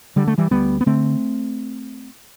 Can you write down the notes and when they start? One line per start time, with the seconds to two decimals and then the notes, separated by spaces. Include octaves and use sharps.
0.16 D3 G3
0.28 A3
0.38 E3 G3
0.51 D2 G3 B3
0.81 B3
0.86 D3 A3 C4